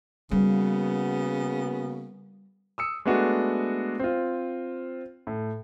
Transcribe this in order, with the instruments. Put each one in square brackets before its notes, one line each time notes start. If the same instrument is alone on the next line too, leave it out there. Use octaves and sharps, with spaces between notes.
[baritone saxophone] C#3 [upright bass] G3 [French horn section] A#3 B3 F#4
[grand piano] D#6 E6 C#7
G#3 A3 B3 D4 F#4
C4 F4
A2